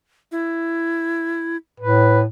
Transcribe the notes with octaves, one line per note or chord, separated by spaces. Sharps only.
E4
A2 B4